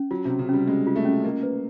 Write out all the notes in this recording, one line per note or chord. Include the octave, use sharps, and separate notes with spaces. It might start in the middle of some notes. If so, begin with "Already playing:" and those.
Already playing: C#4
F#3 F4
C3 C#4
C#3
G3 C#4
G#3 C#4
F4
A3
C#4
A#3 D#5
B4